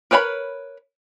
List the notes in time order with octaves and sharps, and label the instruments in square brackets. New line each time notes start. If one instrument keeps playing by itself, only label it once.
[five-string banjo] A#4 B4 C#5 G#5 B5